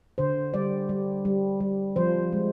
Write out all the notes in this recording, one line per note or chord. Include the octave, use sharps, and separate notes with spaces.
D3 C5
G3 D5
G3
G3
G3
F3 C5
G#3